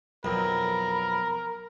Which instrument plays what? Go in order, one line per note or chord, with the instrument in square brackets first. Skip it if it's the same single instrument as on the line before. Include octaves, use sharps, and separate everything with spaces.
[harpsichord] B1 F2 [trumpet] A#4 [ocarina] B5